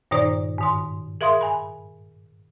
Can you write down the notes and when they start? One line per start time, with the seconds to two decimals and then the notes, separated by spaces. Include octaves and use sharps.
0.11 G2 A#2 D#3 D#4 C5 D5
0.58 G#2 D#3 C6
1.21 G#4 A#4 E5 F5 C6 D#6
1.41 G#5 B5